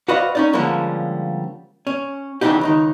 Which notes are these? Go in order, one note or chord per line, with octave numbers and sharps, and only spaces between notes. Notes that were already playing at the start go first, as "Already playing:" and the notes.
F#4 B4 C5 D5 D#5 F5
C#4 D#4 D5
D3 F3 G3 G#3 A#3 C#4
C#4
C#3 E3 A3 D4 D#4 G4
C#2 D#3 D#4